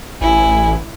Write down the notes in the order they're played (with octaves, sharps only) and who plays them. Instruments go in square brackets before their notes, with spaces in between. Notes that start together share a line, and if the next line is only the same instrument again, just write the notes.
[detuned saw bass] A1 [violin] E4 [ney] G#5